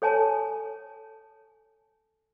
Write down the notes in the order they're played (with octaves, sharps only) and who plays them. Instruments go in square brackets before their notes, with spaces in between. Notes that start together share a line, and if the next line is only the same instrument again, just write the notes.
[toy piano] A4 C#5 G#5 A5